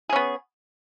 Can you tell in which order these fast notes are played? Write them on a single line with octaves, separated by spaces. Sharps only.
G#4 C#4 B3